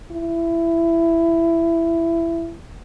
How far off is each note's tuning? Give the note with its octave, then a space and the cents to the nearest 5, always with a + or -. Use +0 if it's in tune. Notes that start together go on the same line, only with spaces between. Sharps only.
E4 +15